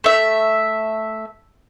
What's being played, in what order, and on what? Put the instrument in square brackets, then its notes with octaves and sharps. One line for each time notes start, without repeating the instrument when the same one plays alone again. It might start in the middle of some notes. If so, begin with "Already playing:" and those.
[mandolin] A3 E5